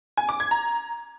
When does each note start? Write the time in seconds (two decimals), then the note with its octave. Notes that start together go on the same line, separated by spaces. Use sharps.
0.17 G#5
0.29 D6
0.40 G#6
0.51 A#5